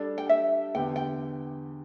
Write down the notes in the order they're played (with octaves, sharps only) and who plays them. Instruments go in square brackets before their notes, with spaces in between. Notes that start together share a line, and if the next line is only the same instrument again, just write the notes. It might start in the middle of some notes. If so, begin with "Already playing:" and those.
Already playing: [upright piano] G3 D4 A4 [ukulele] D5
[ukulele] G5
E5
[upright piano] E2 D3 B3 G4 [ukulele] G5
[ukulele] G5